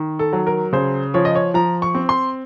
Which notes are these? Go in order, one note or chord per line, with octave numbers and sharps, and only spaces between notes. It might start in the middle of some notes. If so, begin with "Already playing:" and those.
Already playing: D#3
A4
F#3
A#4
C#3 C5
F3 C#5
D#5
C#5
F3 A#5
C#6
C4
C6